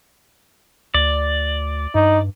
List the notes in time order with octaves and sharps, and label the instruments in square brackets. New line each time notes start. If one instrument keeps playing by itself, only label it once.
[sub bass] D2 [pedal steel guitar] D5
[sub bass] G2 [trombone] D#4